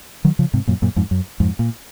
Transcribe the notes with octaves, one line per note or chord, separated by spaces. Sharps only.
D#3 F#3
C#3 F3
G#2 C3
F#2 A#2
F#2 A#2
F2 G#2
F#2
F2 G#2
A#2